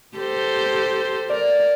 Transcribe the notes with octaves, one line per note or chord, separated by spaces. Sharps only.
G4 A4 C5
A#4 D5